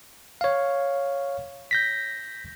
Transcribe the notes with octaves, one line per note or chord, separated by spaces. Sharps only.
C#5 F5
G6 A#6 B6